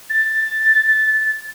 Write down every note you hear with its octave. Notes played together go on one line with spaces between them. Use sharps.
A6